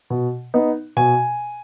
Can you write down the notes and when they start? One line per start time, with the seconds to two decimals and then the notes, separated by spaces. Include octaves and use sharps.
0.10 B2
0.54 B3 D#4
0.97 B2 G#5